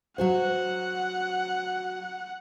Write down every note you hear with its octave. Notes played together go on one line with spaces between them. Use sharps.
F#3 F#4 C5 F#5